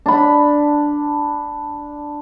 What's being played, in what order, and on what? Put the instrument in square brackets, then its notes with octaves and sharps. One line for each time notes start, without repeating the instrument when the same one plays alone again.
[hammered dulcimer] D4 B5